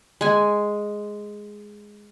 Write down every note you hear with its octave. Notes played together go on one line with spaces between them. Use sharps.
G#3 G#5